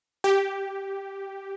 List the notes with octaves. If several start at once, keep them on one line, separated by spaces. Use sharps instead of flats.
G4